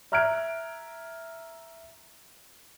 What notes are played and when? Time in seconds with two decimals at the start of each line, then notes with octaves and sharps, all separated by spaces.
0.12 E5 A#5 F6 F#6 G#6 D7